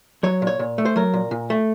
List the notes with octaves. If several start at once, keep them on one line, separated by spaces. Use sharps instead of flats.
F#3 C#5
A#2
C#5
A#2
A3
C5
F#3 A#4
A#2
A#2
A3